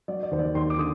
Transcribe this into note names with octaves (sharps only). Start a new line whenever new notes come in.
F#3 D5
D5
D#2 C5
D5
D#2 C6
D6
D3 D#6